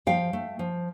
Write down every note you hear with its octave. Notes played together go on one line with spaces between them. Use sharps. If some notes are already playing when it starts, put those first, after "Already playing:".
F3 F5 G5
A3
F3